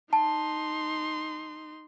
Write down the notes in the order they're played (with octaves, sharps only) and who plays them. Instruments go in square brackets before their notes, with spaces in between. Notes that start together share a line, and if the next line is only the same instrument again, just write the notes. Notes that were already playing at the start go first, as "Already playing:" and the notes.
[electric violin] D#4 C6 [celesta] A5